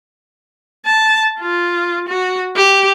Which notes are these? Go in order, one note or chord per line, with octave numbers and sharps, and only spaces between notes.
A5
F4
F#4
G4